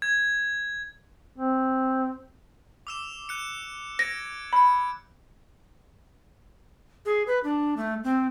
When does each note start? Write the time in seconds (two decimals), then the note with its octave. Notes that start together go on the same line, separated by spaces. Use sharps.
0.02 G#6
1.38 C4
2.87 D6 E6 E7
3.29 F#6 C#7
3.99 G#6 A#6 C#7 D7
4.53 B5 G6 C#7
7.05 G#4
7.27 B4
7.44 D4
7.77 A3
8.04 C4